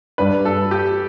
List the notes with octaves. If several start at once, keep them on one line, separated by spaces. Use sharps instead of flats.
G2 G3 D4 G4 B4
A4
G4